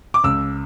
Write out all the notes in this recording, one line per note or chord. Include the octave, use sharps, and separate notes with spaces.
D6
C#2 E6